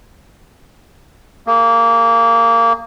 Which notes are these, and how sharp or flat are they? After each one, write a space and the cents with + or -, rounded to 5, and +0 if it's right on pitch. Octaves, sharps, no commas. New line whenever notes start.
A#3 -15 G#4 -20